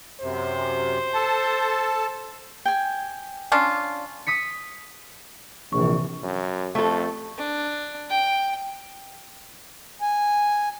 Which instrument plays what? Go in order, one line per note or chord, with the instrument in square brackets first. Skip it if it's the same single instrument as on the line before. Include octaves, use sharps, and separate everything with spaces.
[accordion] F#2 C3 [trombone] C5
[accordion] A4 A5
[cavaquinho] G5 G#5
[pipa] C#4 D4 F4
[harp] D#6 B6 C#7
[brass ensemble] A#1 [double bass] C3 E3 [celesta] C#6
[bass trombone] F#2
[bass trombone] F2 [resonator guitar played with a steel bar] A3 A4
[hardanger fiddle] D4
G5
[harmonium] G#5